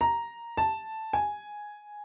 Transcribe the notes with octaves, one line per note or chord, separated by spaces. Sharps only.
A#5
A5
G#5